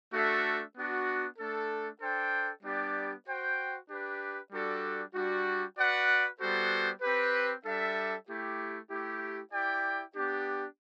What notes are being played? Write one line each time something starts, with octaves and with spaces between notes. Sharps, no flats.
A3 D4 F#4 A4 E5
B3 D4 F#4
A3 D4 A4
D4 A4 C5 G5
G3 B3 D4 G4 D5
F#4 C5 G5
D4 G4 B4
G3 D4 F#4 A4
G3 D4 F#4
F#4 B4 D5 F#5
G3 B3 F#4 A4 C5
C4 G4 B4
G3 D4 A4 E5
A3 E4 G4
A3 E4 G4
E4 G4 D5 G5
B3 D4 G4